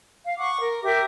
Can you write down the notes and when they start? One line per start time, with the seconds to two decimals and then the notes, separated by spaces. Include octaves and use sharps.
0.24 F5
0.38 F#5 C#6 D6
0.60 A#4
0.83 G4 A#4 E5 D6